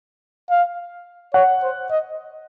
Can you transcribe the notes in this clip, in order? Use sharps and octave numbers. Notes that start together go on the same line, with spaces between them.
F5
C#5 F#5
C5
D#5